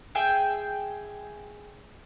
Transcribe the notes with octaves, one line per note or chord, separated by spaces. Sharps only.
G#4 E5 G5